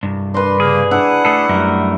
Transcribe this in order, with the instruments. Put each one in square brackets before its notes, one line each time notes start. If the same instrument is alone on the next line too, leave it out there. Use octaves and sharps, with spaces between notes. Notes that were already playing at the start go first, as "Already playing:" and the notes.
[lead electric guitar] C2 G2
[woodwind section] D4 A#4 C6 [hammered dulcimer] B4 D5
[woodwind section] C#3 A#3 [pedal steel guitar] G#4
[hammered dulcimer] D4 E4 [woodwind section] F#5
[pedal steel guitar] A3 G#4 A4
[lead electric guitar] F#2 G3 [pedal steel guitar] A3 A#4